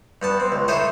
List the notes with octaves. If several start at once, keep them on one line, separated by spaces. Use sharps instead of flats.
G2 B3 A5
C4
C#2
D#4 E4 A4 C5 C#5 D#5